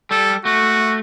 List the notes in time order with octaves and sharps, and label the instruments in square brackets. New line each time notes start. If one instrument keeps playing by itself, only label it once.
[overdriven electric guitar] G3 [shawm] A4
[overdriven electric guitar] A3 [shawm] F#4